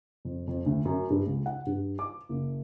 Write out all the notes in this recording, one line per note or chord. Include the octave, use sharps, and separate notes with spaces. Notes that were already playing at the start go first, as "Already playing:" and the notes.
F2
F2
D2
F#2
G2
C#2
F#5
G2
D6
F#1